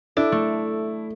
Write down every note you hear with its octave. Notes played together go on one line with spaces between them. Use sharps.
D4 E4 A4
A3